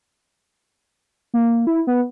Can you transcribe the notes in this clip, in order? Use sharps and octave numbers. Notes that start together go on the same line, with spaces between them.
A#3
E4
B3